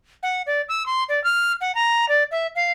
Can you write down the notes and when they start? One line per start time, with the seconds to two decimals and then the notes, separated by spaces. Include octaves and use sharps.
0.23 F#5
0.47 D5
0.69 E6
0.86 C6
1.09 D5
1.24 F6
1.61 F#5
1.75 A#5
2.09 D5
2.31 E5
2.55 F5